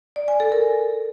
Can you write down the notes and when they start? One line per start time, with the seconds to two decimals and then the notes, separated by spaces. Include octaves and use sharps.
0.16 D5
0.28 G#5
0.40 A4
0.52 A#4